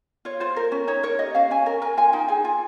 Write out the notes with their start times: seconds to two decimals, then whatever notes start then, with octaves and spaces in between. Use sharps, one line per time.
0.25 F4 C#5
0.40 F4 C5
0.56 A#4
0.72 C#4
0.87 D#4 C#5
1.03 A#4 C#5
1.19 G4 D#5
1.35 C#4 F5
1.51 C#4 G#5
1.66 A#4
1.82 A#4 G#5
1.97 F4 G#5
2.13 D#4 G5
2.28 G#4 G#5
2.44 F4 G#5